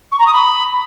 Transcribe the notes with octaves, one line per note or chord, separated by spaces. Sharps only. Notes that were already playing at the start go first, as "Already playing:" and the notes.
C#6
A#5
D#6
B5